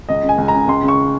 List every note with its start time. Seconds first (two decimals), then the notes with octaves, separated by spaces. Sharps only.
0.09 C#2 D#5
0.23 C#3
0.29 G#5
0.38 C#2
0.48 A#5
0.54 C#3
0.68 C#2 C6
0.83 C#3
0.88 C#6